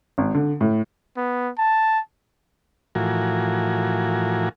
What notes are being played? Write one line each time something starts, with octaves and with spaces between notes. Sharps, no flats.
G#1
D3
A2
B3
A5
A2 E3 F3 F#4 A#4 G#5